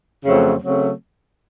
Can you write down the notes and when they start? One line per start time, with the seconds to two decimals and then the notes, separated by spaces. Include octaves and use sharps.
0.24 F2 C#3 F#3 A3 C4
0.61 C#3 F#3 A3 C4